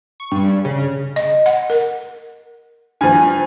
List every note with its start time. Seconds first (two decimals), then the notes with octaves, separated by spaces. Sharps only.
0.20 C#6
0.32 G2
0.65 C#3
1.16 D#5
1.46 F#5
1.70 A#4
3.01 G2 F3 G#5